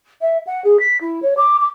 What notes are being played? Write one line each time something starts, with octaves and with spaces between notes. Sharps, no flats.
E5
F#5
G#4
B6
E4
C#5
D6
D6